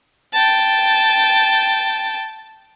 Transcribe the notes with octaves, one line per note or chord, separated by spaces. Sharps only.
G5 A5